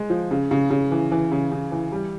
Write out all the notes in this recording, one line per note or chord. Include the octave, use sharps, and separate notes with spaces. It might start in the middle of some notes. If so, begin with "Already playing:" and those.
Already playing: G#3
F3
C#3
C#3
C#3
E3
E3
C#3
C#3
E3
G3